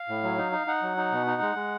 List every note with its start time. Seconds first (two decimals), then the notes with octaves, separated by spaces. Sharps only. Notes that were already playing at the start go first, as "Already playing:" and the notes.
Already playing: F5
0.08 A2
0.23 F#3
0.37 D#4
0.52 D#4
0.67 D#4 F#5
0.83 F#3
0.97 D#4
1.12 B2
1.27 D#4
1.42 G#3
1.56 G#3